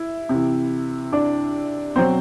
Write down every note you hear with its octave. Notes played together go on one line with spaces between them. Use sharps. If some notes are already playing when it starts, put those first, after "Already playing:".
Already playing: E4
C3 E3
D4 D5
B2 F#3 C4 C5